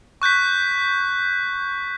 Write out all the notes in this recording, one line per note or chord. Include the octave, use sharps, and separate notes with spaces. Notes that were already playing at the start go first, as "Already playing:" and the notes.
C#6 F#6 G6 B6